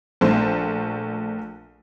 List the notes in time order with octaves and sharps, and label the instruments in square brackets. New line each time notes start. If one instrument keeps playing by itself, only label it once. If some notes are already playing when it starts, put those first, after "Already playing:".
[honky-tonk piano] A#1 A3 C5